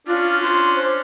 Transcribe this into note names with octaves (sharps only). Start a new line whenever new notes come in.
C#4 D4 F4
C6
C5